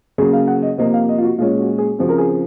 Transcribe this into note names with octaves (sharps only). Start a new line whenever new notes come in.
C#3 F#3 A#3 G#4
F5
F#5
D#5
C3 F3 A#3 D#5
F5
D#5
F4
F#4
A#2 G#3 C#4 F4
F#4
G#4
C#3 F3 C4 F#4
A#4
G#4